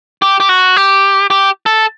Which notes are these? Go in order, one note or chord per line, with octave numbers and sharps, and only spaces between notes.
G4
G4
F#4
G4
G4
A4